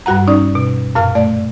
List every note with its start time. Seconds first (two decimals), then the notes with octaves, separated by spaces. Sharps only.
0.06 G2 G3 F#4 F#5 A#5
0.27 C#4 D#4 D5
0.55 B2
0.95 F#2 A#2 F5 F6
1.15 A3 D5